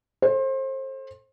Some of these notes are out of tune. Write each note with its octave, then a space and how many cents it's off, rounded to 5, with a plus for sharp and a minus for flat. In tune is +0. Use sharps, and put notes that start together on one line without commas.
A4 -15 C5 +30